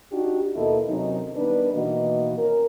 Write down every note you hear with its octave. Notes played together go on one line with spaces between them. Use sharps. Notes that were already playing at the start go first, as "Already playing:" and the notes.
D4 D#4 F#4 G4
D#2 B2 A#3 E4 A4 D#5
C3 D#3 F#3 C#4 D#4
D#3 G3 B3 D4 D#4 B4
B2 D#3 E3 A#3 F#4 D#5
C#4 A#4